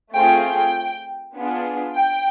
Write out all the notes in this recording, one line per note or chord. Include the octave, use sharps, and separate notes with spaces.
A3 C4 F4 G#4 G5
G5
B3 D4 F4 G#4
G5